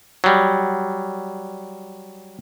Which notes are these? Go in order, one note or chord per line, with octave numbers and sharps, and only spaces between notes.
F#3 G3